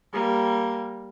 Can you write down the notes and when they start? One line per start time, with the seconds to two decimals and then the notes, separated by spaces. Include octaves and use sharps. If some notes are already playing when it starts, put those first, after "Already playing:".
0.13 G3 A#3